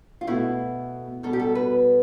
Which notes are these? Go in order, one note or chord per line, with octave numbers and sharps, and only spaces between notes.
F4
B2 A3 E4
B2 G3 A4
G4
A4
B4